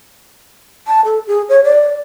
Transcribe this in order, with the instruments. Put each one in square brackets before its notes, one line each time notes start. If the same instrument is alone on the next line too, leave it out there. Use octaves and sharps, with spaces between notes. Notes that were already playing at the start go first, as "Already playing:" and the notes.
[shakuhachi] A5
A4
G#4
C#5
D5